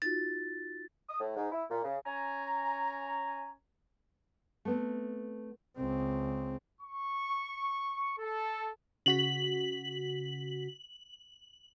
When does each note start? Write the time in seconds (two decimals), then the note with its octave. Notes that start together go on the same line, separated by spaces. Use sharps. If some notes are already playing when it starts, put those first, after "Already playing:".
0.02 D#4 F4 F#4 A6
1.09 D#6
1.21 A2
1.36 G#2
1.52 E4
1.70 A#2
1.83 C#3
2.06 C#4 G#5 A#5
4.65 A3 B3 C4
5.77 C#2 C4
6.82 C#6
8.19 A4
9.06 C#3 F#4 B6 F#7